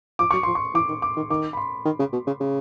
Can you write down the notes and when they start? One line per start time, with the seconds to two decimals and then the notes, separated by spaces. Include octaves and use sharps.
0.19 F3 D6
0.31 F#3 C#6
0.43 F3 C6
0.55 C#6
0.75 E3 D6
0.89 D#3
1.02 D6
1.16 D#3
1.30 D#3 D6
1.53 B5
1.57 C6
1.85 D#3
1.99 C#3
2.13 B2
2.27 C#3
2.40 C#3